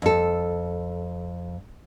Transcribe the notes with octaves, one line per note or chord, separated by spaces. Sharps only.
F2 A4